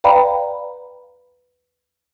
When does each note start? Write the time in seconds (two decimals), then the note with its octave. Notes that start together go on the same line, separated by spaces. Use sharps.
0.04 B4 D5 F5 G5 A#5 B5